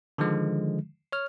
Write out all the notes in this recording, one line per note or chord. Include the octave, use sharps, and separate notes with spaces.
D3 D#3 F3 G#3
C#5 F6